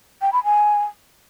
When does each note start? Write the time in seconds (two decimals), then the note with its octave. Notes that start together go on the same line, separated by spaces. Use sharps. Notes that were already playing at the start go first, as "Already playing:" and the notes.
0.22 G5
0.33 B5
0.44 G#5